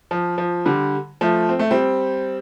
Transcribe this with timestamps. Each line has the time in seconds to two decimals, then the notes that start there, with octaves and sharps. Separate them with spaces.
0.11 F3
0.38 F3
0.65 D3 G3
1.21 F3 A3
1.49 C4
1.59 A3
1.71 G3 C4